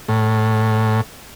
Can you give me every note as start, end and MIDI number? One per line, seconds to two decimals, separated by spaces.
0.08 1.01 45